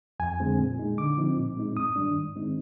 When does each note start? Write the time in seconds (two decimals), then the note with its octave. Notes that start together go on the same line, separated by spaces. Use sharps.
0.20 F2 G#5
0.40 D3 G#3 C4
0.59 A#2
0.78 G#3 D#4
0.98 D3 D6
1.17 F3 C4 D#4
1.37 A#2
1.57 G#3 C4 D#4
1.76 G2 D#6
1.96 D#3 G3 D4
2.16 G#2
2.35 D#3 G#3 C4 D#4